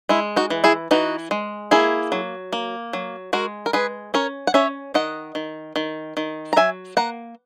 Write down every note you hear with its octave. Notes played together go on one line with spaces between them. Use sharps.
G#3 E4
D#4 F#4
E3
E4 G#4
E3 D#4 F#4
G#3
A#3 E4 G#4
F#3
A#3
F#3
G#3 F#4 A#4
A#4
G#3 G#4 B4
C#4 A#4 C#5
F#5
C#4 C#5 E5
D#3 D#5 F#5
D#3
D#3
D#3
A#5
F#3 E5 G#5
A#3 F#5 A#5